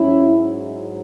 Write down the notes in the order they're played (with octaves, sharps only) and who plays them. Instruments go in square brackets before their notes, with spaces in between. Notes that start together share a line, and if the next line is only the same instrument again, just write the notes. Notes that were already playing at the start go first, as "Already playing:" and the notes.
Already playing: [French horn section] G#2 F#3 C#4 E4